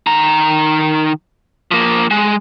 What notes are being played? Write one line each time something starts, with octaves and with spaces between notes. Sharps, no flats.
D#3 A#5
F3 A#3
G#3